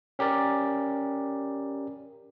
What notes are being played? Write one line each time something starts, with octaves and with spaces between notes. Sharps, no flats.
C#4 G4 A#4 D5